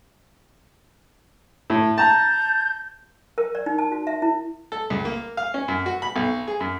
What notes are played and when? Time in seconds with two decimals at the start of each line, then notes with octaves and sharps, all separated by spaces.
1.70 A2
1.98 A5 A#5 G6
3.38 A#4
3.55 D5
3.66 D#4
3.78 A5
3.92 F#4
4.07 E5
4.22 E4
4.72 A4
4.90 C#2
5.05 A#3
5.37 F5
5.54 C#4
5.68 F#2
5.86 F#4
6.02 B5
6.16 B1
6.48 G#4
6.60 F#2